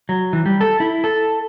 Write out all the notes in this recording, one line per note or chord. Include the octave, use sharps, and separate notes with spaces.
F#3
E3
G3
A4
E4
A4